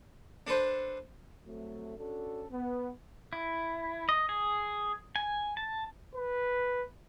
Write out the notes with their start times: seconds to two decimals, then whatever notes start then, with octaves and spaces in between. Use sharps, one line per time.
0.47 D4 A4 B4 C5
1.45 C2 C3 F#3 A3
1.98 C#4 D4 F#4 A4
2.52 B3
3.33 E4
4.09 D#5
4.29 G#4
5.16 G#5
5.57 A5
6.15 B4